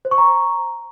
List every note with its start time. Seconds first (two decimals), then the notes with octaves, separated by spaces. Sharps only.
0.05 C5
0.11 C#6
0.18 A#5